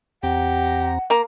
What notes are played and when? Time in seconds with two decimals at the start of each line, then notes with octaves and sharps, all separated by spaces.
0.23 E2 C4 G4 F#5 A#5
1.10 A#3 A#5